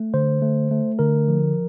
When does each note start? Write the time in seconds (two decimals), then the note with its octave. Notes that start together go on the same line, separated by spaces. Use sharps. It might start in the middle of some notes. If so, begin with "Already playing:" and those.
Already playing: A3
0.14 D3 C5
0.42 A3
0.71 A3
0.99 D3 A#4
1.28 F3